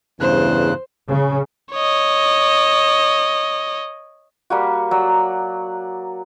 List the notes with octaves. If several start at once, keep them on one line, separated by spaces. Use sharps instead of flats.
E2 G2 C#3 C5 F#6
C#3
C#5 D#5
G3 A#3 F#4
F#3 D5